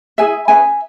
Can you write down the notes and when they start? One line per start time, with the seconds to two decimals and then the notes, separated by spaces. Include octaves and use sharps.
0.18 E4 G#4 B4 E5 G#5
0.48 C#4 G#4 B4 E5 G#5